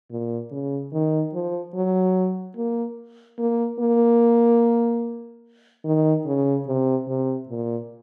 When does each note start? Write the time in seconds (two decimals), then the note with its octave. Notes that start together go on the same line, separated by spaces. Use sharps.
0.10 A#2
0.51 C#3
0.93 D#3
1.34 F3
1.75 F#3
2.57 A#3
3.39 A#3
3.80 A#3
5.84 D#3
6.26 C#3
6.67 C3
7.08 C3
7.49 A#2